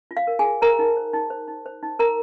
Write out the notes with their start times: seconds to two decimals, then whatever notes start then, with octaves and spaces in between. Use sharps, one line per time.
0.11 F4
0.17 F5
0.27 A#4
0.39 G#4 G#5
0.45 F4
0.61 A#4 C5 A#5
0.79 D#4
0.97 C5
1.13 D#4
1.30 C5
1.48 D#4
1.66 C5
1.83 D#4
1.99 A#4 A#5